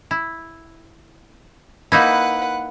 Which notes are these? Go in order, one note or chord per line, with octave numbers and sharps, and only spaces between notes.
E4
A#3 D#4 E4 B4 F#5